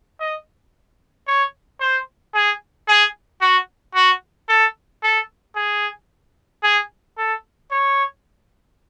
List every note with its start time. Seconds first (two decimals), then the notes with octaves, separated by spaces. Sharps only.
0.20 D#5
1.27 C#5
1.81 C5
2.35 G#4
2.88 G#4
3.41 F#4
3.95 F#4
4.49 A4
5.03 A4
5.56 G#4
6.63 G#4
7.18 A4
7.71 C#5